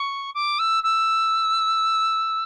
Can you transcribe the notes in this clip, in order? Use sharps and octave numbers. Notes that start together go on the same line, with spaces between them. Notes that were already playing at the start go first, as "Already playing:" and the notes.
Already playing: C#6
D6
E6
E6